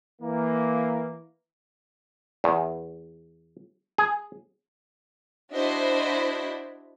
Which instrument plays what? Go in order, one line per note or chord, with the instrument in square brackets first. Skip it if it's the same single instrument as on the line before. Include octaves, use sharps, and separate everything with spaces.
[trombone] E3 [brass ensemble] A#3
[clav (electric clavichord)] E2
G#4
[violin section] D4 E4 F#4 C5 D#5 B5